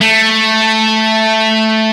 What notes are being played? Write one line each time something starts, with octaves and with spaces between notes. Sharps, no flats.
A3